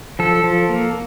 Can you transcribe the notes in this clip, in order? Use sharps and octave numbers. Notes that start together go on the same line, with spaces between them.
F3 A4
F3
A#3